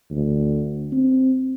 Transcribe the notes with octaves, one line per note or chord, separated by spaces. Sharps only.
D2
C4